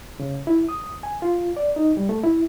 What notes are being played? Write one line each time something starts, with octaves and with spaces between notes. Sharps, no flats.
C#3
E4
D#6
G#5
F4
D5
D#4
G3
A3
E4